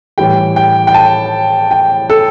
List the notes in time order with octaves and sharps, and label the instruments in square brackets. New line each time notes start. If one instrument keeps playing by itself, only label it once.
[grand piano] A2 E3 G3 G5
G5
G5
A5
G5
A4